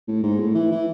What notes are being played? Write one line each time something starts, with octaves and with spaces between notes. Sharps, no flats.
A2
G#2
A2
E3
E3